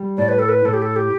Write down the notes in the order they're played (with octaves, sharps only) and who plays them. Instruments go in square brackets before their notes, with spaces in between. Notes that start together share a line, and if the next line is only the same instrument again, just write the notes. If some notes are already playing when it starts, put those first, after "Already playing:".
Already playing: [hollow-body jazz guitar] G3
[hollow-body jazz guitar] A2 [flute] D5
[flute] B4
A4
B4
[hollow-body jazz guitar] A2 [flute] A4
[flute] G4
A4
G4